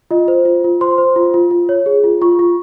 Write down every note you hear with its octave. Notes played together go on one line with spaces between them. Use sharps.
F4 D#5
C5
F4
F4
C5 C6
C5
F4
F4
F4
C#5
G#4
F4
F4 C#6
F4